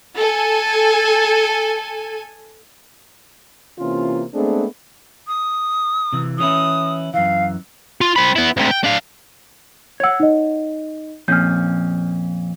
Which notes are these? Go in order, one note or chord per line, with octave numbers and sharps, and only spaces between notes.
A4 G#5
C3 E3 A#3 C#4 F4
G#3 A3 B3 C4 D4 G#4
D#6
C3 E3
E3 C#4 E4 D#6
F#2 E3 F5
F4
C4 B5
B3 E4
D2 C3
G5
D4 F5
C#5 F#5 E6 G#6
D#4 D#5
F2 A#2 C#4 F6 G6